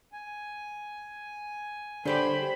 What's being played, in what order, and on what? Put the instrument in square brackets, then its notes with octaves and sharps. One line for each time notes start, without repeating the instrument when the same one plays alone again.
[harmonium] G#5
[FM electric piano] D3 [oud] G3 G4 C#5 [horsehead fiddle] C5 B5